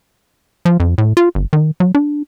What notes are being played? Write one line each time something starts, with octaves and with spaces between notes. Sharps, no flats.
F3
F2
A2
F4
G1
D#3
F#3
D4